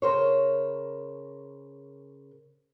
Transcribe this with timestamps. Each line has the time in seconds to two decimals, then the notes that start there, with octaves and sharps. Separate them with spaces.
0.02 C#3 A#4 C5 C#5